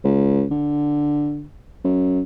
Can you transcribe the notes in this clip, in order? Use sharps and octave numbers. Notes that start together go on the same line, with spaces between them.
C#2
D3
F#2